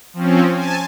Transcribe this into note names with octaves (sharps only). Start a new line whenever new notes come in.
F3 C4 C#4
G#5 A5